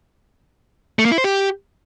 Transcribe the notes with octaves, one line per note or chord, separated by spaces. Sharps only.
A3
A#3
E4
C5
G4